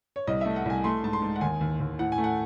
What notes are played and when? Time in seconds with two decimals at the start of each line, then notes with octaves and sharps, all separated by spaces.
0.16 C#5
0.27 C2 D#5
0.41 A3 E5
0.56 F#5
0.65 C2 G#5
0.84 A3 C6
1.03 G#2 A5
1.13 C6
1.22 G#2
1.36 F#5
1.41 D#2 G#5
1.61 D#2
1.80 D#2
1.99 A2 F#5
2.12 G#5
2.18 A3
2.24 F#5